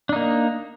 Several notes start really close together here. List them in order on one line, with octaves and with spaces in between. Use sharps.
D4 D#4 A#3